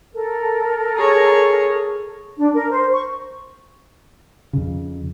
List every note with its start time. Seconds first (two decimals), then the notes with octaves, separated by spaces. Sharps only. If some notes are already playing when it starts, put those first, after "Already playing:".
0.14 A4 A#4
0.96 G#4 C#5
2.37 D4
2.54 A#4
2.71 C5
2.92 C#6
4.53 F2 C#3